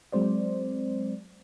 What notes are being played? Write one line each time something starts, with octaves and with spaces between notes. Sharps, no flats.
F#3 G#3 C4 C5 D5